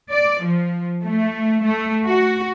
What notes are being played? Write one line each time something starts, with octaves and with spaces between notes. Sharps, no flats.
D5
F3
A3
A3
F#4